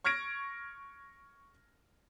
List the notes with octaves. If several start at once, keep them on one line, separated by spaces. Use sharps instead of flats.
C#6 F6 G#6 A#6 D7